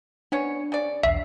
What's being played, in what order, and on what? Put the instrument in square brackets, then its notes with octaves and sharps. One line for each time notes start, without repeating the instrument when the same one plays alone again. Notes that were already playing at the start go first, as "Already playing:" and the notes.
[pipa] B3 C#4 C#5 [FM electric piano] D4
[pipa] C#3 D5
[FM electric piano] B1 E2 C7 [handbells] E5